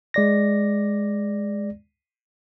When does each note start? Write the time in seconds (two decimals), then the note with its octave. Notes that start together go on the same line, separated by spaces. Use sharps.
0.14 G#3 D5 A#6